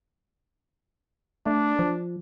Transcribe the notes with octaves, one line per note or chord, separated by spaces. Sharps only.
A3 D4
F3